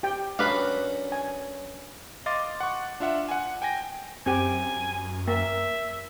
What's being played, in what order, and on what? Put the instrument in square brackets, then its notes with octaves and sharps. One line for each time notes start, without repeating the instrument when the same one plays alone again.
[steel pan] G4 G5
[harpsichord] F#2 F#4 A4 [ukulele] D4 B4 [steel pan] F5
[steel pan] G#5
[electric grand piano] D#5 F5 C6 D6 A6
F#5 C#6
D4 F4 E5 F#5
F#5 G#5
G5 G#5 A#6
[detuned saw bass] F#2 [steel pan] C4 G4 [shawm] G#5
[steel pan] A#3 [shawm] E5